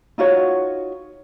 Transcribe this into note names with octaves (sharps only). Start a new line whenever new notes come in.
D#4 F4 F#4 C#5